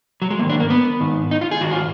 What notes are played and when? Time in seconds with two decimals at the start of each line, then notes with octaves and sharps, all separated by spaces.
0.22 F#3
0.30 G#3
0.39 G#2 D#3 A#3
0.50 D4
0.60 A#3
0.70 B3
1.00 G#2 D#3
1.31 D#4
1.41 F4
1.51 G#4
1.61 G#2 D#3 F#4
1.71 F4